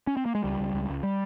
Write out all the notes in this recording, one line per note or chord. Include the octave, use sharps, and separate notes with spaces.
C#4
C4
A#3
G#3
C#2 G3
C#2
C#2
C#2
G3